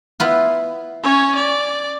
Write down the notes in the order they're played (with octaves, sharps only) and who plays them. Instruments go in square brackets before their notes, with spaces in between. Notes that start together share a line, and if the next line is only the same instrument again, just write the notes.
[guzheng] B3 E4 F4
[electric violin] C#4 C#5
D5